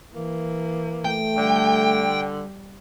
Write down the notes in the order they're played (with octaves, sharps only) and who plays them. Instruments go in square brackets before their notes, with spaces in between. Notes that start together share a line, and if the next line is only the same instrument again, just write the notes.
[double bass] E3 [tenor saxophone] A#3
[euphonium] A3 [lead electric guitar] G5
[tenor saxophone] D3 [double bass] G3